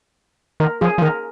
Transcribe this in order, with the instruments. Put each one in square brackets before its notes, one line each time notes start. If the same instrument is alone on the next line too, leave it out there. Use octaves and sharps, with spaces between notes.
[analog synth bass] D#3 [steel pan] A#4
[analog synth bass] F3 [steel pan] G#4
[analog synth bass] F3
[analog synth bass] D#3 [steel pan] A#4